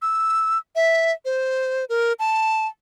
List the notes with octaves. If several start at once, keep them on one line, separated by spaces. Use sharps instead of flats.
E6
E5
C5
A#4
A5